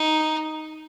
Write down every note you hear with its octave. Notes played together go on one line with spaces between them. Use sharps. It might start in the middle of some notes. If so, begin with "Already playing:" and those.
Already playing: D#4